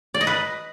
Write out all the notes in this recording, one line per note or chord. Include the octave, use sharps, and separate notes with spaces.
D5
D#5
B4